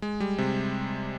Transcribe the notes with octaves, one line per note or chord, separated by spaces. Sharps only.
G#3
G3
C3